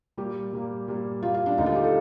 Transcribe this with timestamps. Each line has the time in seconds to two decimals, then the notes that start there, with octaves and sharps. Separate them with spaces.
0.17 A#2 G3 A#3 G4
0.53 A#2 G3 A#3
0.88 A#2 G3 A#3
1.23 A#2 G3 A#3 F4
1.34 F4
1.46 D4
1.58 D#2 D3 A3 D#4
1.66 F4
1.75 G4
1.84 A4